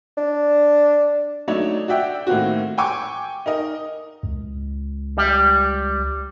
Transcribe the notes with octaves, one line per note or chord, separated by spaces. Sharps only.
D4
F#3 A3 D4 D#4 C#5
F#4 D5 E5 G5
A2 D#3 A#3 C4 F#4
G5 G#5 C#6 D6
D#4 A#4 D#5
C#2
G3